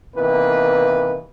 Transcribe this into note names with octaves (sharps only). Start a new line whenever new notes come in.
C3 D#3 E3 A#3 B3 B4